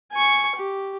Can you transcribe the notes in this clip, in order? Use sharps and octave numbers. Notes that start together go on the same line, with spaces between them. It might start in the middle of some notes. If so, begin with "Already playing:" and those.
G#5 C#6
G4